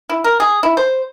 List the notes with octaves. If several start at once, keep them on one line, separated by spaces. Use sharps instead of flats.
E4
A#4
G#4
E4
C5